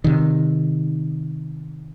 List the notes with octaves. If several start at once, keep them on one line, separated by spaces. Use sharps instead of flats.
C3 D#3